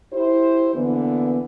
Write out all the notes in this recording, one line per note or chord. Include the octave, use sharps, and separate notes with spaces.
E4 G4 C5
D3 E3 A#3 B3